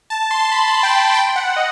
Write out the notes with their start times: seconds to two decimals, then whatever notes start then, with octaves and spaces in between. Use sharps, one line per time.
0.10 A5
0.31 C6
0.52 B5
0.68 A5
0.83 G5
0.99 B5
1.14 G5
1.36 F#5
1.56 D#5